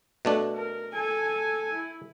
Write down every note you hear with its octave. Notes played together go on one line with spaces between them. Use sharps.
B2 A3 D4
A#4
A4 G#5
E4